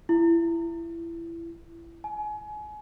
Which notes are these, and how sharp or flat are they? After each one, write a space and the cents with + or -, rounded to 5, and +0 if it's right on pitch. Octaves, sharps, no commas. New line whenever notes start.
E4 +25
G#5 +30